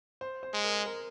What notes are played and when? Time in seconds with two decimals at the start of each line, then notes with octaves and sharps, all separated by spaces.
0.21 C5
0.43 C5
0.54 G#3
0.64 A#4
0.86 A#4